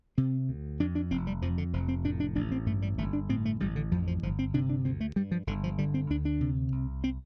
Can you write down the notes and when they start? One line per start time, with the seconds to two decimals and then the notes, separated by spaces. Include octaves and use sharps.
0.18 C3 C4
0.49 D2
0.80 F2 D4
0.95 D4
1.11 F1 C4
1.27 G3
1.42 F2 F3
1.58 D3
1.73 F1 F3
1.88 C4
2.05 A2 D4
2.20 D4
2.36 A1 D4
2.51 C4
2.66 G2 A3
2.82 G3
2.98 G1 A3
3.13 D4
3.29 A2 C4
3.45 A3
3.60 A1 G3
3.76 D3
3.92 F2 F3
4.07 F3
4.23 G1 F3
4.39 C4
4.54 C3 D4
4.70 D4
4.85 D2 C4
5.00 A3
5.16 G2 G3
5.31 F3
5.47 G1 D3
5.64 F3
5.78 D3 G3
5.94 C4
6.10 D2 D4
6.25 D4
6.41 C3
6.72 C2
7.04 C4